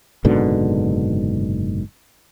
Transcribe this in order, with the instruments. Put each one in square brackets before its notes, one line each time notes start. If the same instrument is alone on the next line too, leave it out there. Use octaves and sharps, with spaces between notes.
[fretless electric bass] F#1 G#2 B2 D3